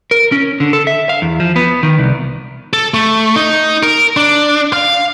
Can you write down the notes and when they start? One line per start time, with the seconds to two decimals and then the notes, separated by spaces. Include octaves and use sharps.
0.11 A#4
0.32 C#4
0.60 D3
0.73 A4
0.87 E5
1.09 F5
1.22 E2
1.40 F3
1.56 B3
1.83 D#3
1.98 C2
2.73 A4
2.94 A3
3.36 D#4
3.83 A#4
4.17 D4
4.73 F5